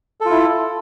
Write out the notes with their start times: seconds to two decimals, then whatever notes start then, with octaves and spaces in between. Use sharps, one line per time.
0.21 A4
0.26 F4
0.30 E4